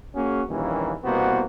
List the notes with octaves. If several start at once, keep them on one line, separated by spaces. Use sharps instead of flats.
A#3 C#4 F#4 G#4
A#1 D#2 E3 G3 A#3 C#4
C2 B2 A#3 B3 F#4 C5